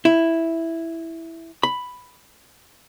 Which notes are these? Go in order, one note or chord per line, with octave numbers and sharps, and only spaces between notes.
E4
B5